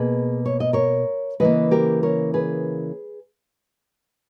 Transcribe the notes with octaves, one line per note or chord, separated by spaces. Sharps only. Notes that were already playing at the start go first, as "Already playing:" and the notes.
Already playing: B2 A#3 G#4 B4
C#5
D#5
A#4 C#5
C#3 E3 A#3 B4 D#5
G4 A#4
A#4 C#5
G#4 B4